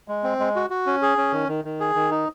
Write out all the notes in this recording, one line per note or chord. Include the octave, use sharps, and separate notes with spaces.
G#3
C4
G#3
F#4
F#4
C#4
G#4
C#4
D#3
D#3
D#3
G#4
D#3
D#4